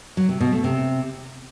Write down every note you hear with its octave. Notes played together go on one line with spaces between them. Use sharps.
F#3
C3
B2
A3
C3